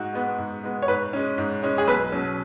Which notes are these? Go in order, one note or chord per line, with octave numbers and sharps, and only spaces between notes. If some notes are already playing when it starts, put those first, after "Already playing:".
Already playing: G#2 F#4
G#3 B3
G#2
G#3 B3
C#5
G#2 B4
G#3 C#4
G#2
G#3 C#4
G#4
B1 B4
B2 F#3 C#4